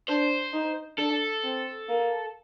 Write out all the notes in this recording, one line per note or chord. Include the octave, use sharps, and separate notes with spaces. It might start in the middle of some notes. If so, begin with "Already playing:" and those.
D4 C5
D#4
D4 A4
C4
A#3